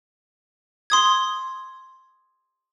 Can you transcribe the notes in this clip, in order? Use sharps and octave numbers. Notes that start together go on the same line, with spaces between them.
C6 D#6 G#6